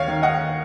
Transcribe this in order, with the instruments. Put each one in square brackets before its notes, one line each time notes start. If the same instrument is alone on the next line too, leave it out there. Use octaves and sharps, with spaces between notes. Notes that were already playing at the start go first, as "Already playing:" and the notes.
Already playing: [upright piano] D#2 C#5 F5
D#3
D#5 F#5